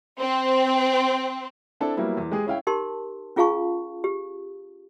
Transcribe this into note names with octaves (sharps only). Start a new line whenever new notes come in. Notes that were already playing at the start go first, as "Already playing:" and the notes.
C4
C4 D4 E4 A4 A5
F#3 G3 A#3 B3 E4
E2
G#3 G4 G#4
C#4 E4 F5 G5
D#4 G4 A#4 A5 C6
C#4 F4 G#4 F5 A5 C#6
G4